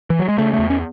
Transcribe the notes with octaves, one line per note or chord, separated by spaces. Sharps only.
E3
F#3
G#3
C#3 A3
A3
E2
C#4